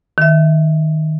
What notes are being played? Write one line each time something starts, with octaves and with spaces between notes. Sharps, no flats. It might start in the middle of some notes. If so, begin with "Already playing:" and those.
D#3 E5